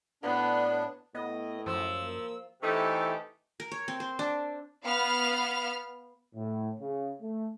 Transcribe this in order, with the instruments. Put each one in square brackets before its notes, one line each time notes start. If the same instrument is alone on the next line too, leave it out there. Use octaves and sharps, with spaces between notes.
[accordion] A2 D4 [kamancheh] B3
[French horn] A2 [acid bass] B3 [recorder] D#5
[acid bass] F#2 [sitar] F3 [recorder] E6
[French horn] A#3
[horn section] C3 E3 A3 D#4 G4 A4
[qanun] A#4
C#5
C4
C5
D4
[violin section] B3 F5 F6
[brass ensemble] A2
C#3
A3